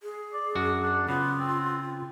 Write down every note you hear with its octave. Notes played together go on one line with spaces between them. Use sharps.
G#4
D5
F#2 D4 F#4
D4
C#3 B3 F4
C4